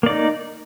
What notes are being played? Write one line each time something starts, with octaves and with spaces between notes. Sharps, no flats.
A#3 D#4 D5